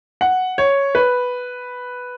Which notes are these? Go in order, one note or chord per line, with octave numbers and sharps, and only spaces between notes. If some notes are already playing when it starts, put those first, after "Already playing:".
F#5
C#5
B4